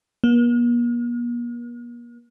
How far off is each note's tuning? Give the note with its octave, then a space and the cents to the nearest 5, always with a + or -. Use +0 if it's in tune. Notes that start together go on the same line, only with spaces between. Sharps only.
A#3 +45